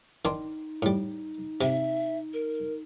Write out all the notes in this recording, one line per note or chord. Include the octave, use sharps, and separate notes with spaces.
D#3 D4 D#4 C6
A2 G3
C3 E5
A#4